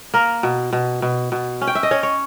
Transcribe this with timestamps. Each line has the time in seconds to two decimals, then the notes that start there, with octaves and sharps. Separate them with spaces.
0.14 A#3 A#4
0.43 B2
0.73 B2
1.02 B2
1.32 B2
1.61 C#4
1.67 G5
1.75 E5
1.83 D#5
1.91 C#4 C#5
2.03 C#5